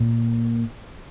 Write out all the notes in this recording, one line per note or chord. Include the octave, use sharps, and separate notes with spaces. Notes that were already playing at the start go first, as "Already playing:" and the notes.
Already playing: A#2